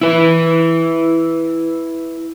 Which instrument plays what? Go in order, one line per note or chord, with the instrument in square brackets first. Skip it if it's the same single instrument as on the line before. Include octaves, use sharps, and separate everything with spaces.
[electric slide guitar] E4 B4